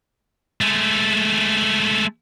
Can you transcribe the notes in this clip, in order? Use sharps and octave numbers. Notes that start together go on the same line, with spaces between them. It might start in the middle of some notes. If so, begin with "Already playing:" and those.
G#3 A3